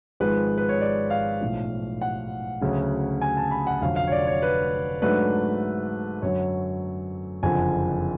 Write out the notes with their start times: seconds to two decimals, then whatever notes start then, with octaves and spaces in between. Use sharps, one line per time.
0.20 G#1 G#2 F3 G#3 B4
0.58 B4
0.69 C#5
0.81 D5
1.10 F5
1.41 B1 A2 F3
2.01 F#5
2.61 D2 C#3 F#3 C#4
3.21 G#5
3.37 A5
3.51 B5
3.67 F#5
3.81 F1 F2 D3 F#3 F5
3.96 F5
4.07 C#5
4.12 D5
4.27 C#5
4.42 B4
5.02 G#2 F#3 A3 D4 B4
6.22 F#2 D3 F#3 C#5
7.43 F#1 F2 D3 F3 G#5